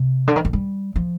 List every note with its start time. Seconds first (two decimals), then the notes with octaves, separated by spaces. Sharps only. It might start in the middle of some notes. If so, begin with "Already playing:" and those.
Already playing: C3
0.27 D3
0.36 D#3
0.45 F3
0.53 G3
0.96 F3